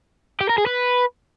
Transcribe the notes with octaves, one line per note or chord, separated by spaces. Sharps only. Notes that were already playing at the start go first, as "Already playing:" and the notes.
G4
A#4
G#4
B4